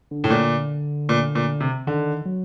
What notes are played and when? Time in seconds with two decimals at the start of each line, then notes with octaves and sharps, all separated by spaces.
0.11 D3
0.24 A2
0.30 A#2
1.09 A#2
1.35 A#2
1.60 C3
1.87 D3 D#3
2.25 F#3